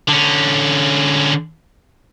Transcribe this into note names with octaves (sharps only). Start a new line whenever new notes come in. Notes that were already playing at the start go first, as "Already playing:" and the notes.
D3 C#4